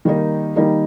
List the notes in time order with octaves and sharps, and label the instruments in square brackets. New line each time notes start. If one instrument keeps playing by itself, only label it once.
[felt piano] D#3 G3 A#3 D#4
D#3 G3 A#3 D#4